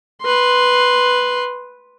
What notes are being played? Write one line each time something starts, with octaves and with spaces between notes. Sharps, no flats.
B4 C6